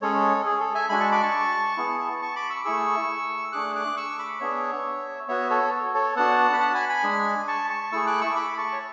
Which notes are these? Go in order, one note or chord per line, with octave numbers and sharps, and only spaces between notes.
G#3 C#4 G#4 A4 C#5
G#4
A4
E5 G#5
G#3 D4 F#4 G#5 B5
A5 C#6
B5 D6
A5 C#6
B3 E4 G#4
A5 C#6
B5 D6
C#6 E6
A3 E4 G#4 C#6 E6
A3 D4 G#4 D6 F#6
D6 F#6
C#6 E6
B5 D6
B3 D4 G#4 C#5 E5
B3 F#4 C#5 E5
A4 C#5
A4 C#5
B3 D4 F#4 F#5 A5
B5
F#5 A5
G#5 B5
G#5 B5
G#3 D4 G#4
A5 C#6
A5 C#6
A3 E4 G#4 C#6 E6
D6 F#6
C#6 E6
B5 D6
B5
A5 C#6
C#5